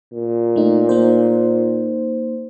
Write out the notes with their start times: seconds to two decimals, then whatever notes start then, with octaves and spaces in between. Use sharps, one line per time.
0.13 A#2
0.56 A3 D#4
0.89 A#3 D#4 C5